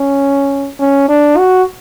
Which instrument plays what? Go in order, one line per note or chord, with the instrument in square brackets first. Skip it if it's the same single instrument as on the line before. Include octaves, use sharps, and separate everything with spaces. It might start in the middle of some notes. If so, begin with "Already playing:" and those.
Already playing: [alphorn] C#4
C#4
D4
F#4